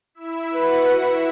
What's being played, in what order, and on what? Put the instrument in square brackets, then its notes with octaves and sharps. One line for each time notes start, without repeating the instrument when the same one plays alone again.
[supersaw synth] E4 E5
[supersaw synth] F#4 F#5 [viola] B4
[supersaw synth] E4 E5